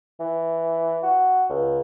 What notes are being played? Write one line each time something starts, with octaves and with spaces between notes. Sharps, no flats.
E3
F#4
C#2